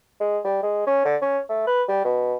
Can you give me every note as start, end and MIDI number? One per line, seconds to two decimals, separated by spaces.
0.20 0.39 56
0.44 0.59 55
0.63 0.85 56
0.87 1.04 61
1.05 1.16 50
1.22 1.39 61
1.49 1.64 57
1.67 1.83 71
1.88 2.02 55
2.04 2.36 47